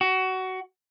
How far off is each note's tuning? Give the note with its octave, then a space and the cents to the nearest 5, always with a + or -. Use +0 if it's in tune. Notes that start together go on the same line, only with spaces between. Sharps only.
F#4 +20